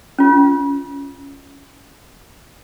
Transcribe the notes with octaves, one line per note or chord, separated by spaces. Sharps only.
C#4 F4